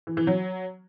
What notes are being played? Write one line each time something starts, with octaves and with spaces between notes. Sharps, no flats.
E3
E3
F#3